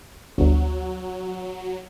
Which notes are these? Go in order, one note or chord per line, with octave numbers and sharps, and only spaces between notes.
G1 D2 F#3